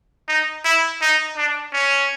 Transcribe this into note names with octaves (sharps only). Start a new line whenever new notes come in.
D#4
E4
D#4
D4
C#4